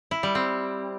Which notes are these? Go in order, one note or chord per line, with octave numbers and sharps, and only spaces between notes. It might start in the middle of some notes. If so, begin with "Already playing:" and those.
E4
G3
C4